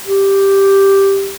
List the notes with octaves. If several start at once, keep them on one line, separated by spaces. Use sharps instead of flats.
G4